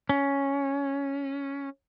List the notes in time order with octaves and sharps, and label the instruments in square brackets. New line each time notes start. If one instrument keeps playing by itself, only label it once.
[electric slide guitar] C#4